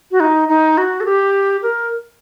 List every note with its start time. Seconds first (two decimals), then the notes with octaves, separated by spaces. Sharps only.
0.11 F#4
0.20 D#4
0.49 D#4
0.78 F#4
1.01 A4
1.05 G4
1.62 A#4